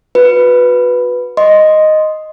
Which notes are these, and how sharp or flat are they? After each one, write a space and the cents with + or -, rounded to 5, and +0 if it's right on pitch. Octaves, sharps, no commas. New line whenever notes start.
F#4 -30 B4 +0
D#5 +0 C6 +0